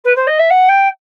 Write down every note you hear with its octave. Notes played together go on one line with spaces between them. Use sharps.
B4
C5
D#5
E5
F#5
G5